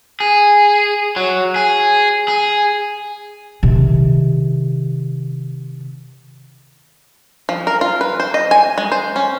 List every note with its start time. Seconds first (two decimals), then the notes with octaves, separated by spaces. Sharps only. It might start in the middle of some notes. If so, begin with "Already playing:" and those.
0.20 G#4
1.16 F#3
1.56 G#4
2.28 G#4
3.63 C3 D#3
7.49 F3
7.67 A#4
7.81 F4
8.01 B4
8.20 C5
8.34 D#5
8.51 G#5
8.78 G#3
8.92 C5
9.16 C#4